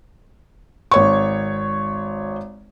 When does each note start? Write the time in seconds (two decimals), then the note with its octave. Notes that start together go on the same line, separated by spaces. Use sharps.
0.91 G#1 C#5 C#6